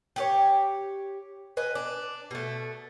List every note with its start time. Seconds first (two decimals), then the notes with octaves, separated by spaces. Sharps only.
0.16 G4 G#4 C#5
1.57 B4 D#5 G#5
1.75 D4
2.31 B2 A3